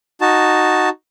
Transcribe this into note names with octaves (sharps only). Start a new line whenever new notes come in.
D#4 F#4 A5